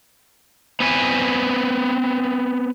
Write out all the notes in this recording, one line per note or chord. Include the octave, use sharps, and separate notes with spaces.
B3 C4 B4 G#5